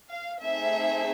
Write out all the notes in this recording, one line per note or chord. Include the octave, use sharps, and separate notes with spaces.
F5
A3 C4 D#4 G#4 E5